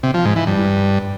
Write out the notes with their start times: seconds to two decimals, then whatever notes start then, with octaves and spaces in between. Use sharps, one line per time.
0.03 C3
0.14 F3
0.25 G#2
0.36 E3
0.47 G2